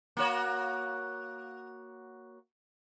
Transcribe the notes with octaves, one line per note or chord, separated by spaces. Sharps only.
A#3 F#4 C#5